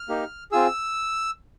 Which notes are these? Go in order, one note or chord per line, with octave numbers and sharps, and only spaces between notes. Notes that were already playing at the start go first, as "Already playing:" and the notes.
Already playing: F6
A#3 D#4 G4
C4 F4 G#4 E6